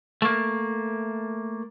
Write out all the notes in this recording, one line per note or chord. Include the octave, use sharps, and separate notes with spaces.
A3 A#3